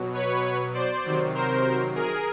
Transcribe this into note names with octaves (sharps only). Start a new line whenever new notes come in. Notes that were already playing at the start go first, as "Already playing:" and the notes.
Already playing: B2 F#3
B4 C#5
C5 D5
C3 D#3 F#3
A#4 C5
G#4 A#4